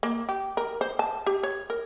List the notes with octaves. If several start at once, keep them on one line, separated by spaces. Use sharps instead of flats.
A#3
G4
A#4
C5
A5
G4
C#5
A#4